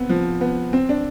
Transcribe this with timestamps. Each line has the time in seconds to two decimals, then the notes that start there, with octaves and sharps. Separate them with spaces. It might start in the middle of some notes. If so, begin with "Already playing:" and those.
Already playing: B3 C4
0.09 F3
0.41 B3
0.73 C4
0.89 D4